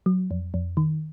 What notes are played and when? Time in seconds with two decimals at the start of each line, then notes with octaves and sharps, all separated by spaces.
0.06 F#3
0.31 F2
0.54 F2
0.77 D#3